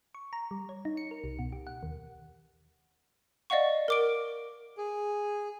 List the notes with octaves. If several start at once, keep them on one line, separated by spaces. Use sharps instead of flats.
C#6
A#5
G3
C#5
D#4
C#7
A#4
C2
B2
G4
F#5
D#2
D5 D#5 F5 F#5 C#6
A#4 D6 D7
G#4